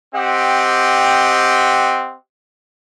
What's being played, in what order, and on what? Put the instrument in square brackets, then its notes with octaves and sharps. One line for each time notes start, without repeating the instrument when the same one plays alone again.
[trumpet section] C4 G4 D#5 F#5